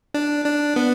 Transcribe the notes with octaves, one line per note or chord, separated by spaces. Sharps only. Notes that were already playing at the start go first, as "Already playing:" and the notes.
D4
D4
B3